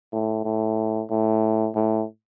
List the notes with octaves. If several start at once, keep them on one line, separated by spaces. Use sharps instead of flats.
A2
A2
A2
A2